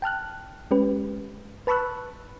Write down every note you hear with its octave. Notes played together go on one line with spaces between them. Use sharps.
G5 A5 F6 F#6
G#3 C#4 G4 B4
B4 A5 B5 C#6 E6 F#6